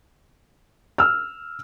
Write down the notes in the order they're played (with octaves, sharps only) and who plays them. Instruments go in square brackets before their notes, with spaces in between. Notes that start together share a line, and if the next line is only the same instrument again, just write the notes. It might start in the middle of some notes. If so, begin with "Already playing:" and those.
[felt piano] E6 F6